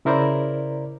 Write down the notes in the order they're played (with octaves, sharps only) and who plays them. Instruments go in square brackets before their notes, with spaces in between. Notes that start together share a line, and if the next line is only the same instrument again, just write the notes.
[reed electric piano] C#3 E4 A#4 C5 D5 A#5